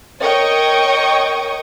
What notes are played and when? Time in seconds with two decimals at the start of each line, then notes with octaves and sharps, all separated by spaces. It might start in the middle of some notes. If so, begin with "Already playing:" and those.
0.21 A#4 C#5 D#5 G5 C#6 D#6